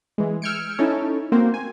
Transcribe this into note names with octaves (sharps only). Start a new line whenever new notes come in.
E3 G#3
E6 F6 G6 G#6 C#7 D7
C#4 D#4 E4 A4 C#5
A#3 C4 F#4 C5
G#5